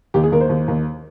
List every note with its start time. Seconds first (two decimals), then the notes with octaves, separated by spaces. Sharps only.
0.14 D#2 G4
0.24 G#4
0.32 D#2 A#4
0.41 C5
0.49 D#2
0.68 D#2